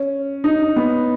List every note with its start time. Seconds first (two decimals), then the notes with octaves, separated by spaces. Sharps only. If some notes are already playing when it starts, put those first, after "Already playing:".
Already playing: C#4
0.44 D#4
0.76 B3